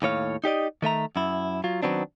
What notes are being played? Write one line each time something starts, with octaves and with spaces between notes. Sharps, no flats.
D#2 A2 C#5 F5
D#4 G4 D5 D#5
D#3 A3 E5 A#5
F#2 E4
F#3 F4
D#3 F#3 B3 C4 D4